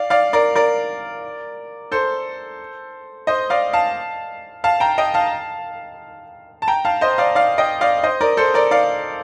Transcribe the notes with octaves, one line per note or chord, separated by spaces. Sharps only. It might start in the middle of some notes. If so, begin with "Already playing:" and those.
Already playing: D5 F5
D5 F5
A#4 D5
A#4 D5
A4 C5
C5 D#5
D5 F5
F5 A5
F5 A5
G5 A#5
D#5 G5
F5 A5
A5
G5 A#5
F5 A5
C5 D#5
D5 F5
D5 F5
D#5 G5
D5 F5
C5 D#5
A#4 D5
A4 C5
A#4 D5
D5 F5